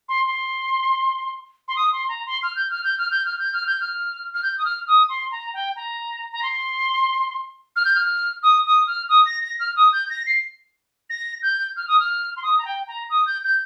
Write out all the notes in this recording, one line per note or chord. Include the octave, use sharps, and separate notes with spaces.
C6
C6
C6
D#6
C6
A#5
C6
F6
G6
F6
G6
F6
G6
F6
G6
F6
G6
F6
F6
G6
D#6
F6
D#6
C6
A#5
G5
A#5
A#5
C6
F6
G6
F6
D#6
D#6
F6
D#6
A#6
A#6
F6
D#6
G6
A#6
C7
A#6
G6
F6
D#6
F6
C6
D#6
A#5
G5
A#5
D#6
G6
G6